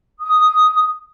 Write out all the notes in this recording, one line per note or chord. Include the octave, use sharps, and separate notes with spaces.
D#6